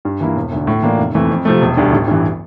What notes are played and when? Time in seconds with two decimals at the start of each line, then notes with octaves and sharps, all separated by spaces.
0.05 G2
0.21 E3 A#3 E4
0.36 E1
0.52 D2 D3
0.67 A2
0.82 E3 A#3 D4 F4
0.98 F1
1.15 F2 E3 A3
1.30 F2
1.45 C3 F3 A3
1.62 E1
1.77 D2 D3 G3
1.93 A1
2.08 G2 E3